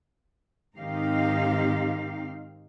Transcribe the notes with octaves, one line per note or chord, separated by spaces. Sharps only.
G#2 D#3 C4 D#4 G4 F5